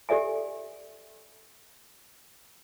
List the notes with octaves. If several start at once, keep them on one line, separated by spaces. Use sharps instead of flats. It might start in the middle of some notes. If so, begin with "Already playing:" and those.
G4 A4 D5 E5 G#5